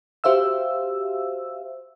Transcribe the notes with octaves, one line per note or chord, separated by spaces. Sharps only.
F#4 G4 C5 E5 F5 E6